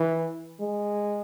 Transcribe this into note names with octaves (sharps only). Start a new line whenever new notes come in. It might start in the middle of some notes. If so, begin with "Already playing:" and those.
Already playing: E3
G#3